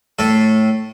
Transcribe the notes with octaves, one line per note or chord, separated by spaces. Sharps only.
A2 A4